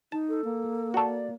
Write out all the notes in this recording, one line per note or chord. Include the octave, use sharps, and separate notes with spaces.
D#4 A5
A4
A#3
F#4 A4 D5